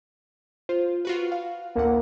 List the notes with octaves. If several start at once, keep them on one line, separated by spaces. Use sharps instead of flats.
F4 C5
F4 F#4 B4
F5
A1 D2 A#3 F#5